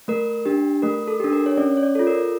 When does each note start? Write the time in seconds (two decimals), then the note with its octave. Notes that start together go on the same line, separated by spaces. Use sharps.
0.08 A3 A#4
0.46 D4 G4
0.82 A3 A#4
1.08 A4
1.20 D4 G4
1.33 A#4
1.46 C#5
1.57 C#4 D5
1.77 C#5
1.83 D5
1.95 F4 A4
2.07 A#4